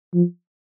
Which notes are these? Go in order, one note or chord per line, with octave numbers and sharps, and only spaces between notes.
F3